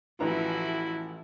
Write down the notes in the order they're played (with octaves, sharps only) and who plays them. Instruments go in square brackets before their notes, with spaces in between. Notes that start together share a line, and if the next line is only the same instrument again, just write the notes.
[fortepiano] A1 B4 A#5 [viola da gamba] E3 F3 F#4 [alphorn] E4